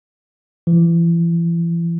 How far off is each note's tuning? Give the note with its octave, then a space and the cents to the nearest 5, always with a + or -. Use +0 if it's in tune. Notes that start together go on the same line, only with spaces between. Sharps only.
E3 +35